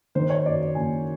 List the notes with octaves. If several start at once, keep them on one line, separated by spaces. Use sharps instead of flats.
D#3 C5
C#5
F#2 D5
D5
F#1 G#5